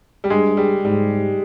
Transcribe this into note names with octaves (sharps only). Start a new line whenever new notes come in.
G3
G2 G#3
G3
G#2 G3